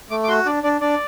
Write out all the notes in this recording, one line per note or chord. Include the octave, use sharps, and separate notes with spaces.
A3 D6
D6
F#4 C6
D4 D5
D4 D5
D4 D5